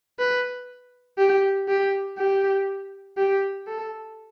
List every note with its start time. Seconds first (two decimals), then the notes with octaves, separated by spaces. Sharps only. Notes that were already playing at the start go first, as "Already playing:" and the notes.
0.19 B4
1.18 G4
1.68 G4
2.18 G4
3.18 G4
3.67 A4